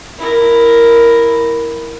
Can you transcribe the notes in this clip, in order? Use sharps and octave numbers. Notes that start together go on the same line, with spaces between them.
E4 A#4